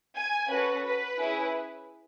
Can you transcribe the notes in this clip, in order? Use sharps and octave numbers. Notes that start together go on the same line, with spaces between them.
G#5
C#4 F#4 A4 B4
B4
C#4 E4 G#4